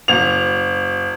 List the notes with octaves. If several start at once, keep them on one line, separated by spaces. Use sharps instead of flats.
F#1 F7